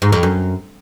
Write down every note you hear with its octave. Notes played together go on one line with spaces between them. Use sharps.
G#2
F2
F#2